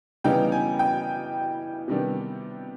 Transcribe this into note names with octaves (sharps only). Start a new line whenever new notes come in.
C#3 E3 G3 B3 D#4 G5
G#5
G5
C3 D#3 G3 B3 D4